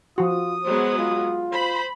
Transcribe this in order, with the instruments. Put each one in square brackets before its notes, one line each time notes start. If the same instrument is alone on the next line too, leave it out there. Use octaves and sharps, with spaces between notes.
[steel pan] F3 F#4 [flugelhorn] F4 [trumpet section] D#6
[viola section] F#3 G#3 B3 [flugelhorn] C5
[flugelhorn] F4
[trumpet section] C5 [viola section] B5